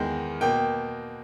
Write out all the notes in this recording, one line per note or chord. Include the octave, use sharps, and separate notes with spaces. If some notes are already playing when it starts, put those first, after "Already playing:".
Already playing: E2 D#3 G#3 G5
B2 A#3 G5